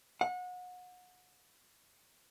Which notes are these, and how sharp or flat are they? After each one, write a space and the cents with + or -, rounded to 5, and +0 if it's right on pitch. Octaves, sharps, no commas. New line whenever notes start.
F#5 -30